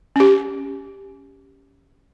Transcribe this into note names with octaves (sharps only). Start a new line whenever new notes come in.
C#4 G4